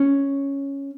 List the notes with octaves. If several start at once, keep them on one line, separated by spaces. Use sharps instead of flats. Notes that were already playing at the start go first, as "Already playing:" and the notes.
Already playing: C#4